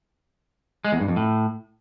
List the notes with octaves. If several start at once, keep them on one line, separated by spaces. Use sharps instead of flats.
G#3
E2
G2
F2
A2